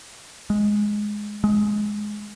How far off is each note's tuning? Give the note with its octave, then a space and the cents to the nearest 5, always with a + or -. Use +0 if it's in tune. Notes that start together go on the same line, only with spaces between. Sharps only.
G#3 +0
G#3 +10